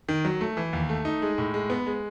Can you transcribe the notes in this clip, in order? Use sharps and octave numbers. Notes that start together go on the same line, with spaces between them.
D#3
F#3
A3
E3
D#2
A3
D#4
G#3
A2
G#3
B3
G#3